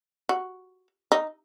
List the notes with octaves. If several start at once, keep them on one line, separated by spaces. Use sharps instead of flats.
F#4
D#4